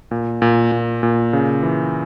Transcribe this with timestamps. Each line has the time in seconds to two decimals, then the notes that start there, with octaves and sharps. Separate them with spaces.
0.11 A#2
0.42 A#2
0.72 A#2
1.03 A#2
1.33 C#3
1.63 E3